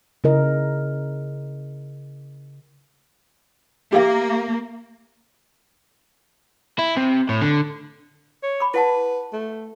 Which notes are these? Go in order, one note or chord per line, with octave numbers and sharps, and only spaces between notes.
C#3 E4 A#4 D#5
A#3 G4 E5 F5
E4
C3
A2
D3
C#5
B5 D6
E4 B4 F#5 A5
A3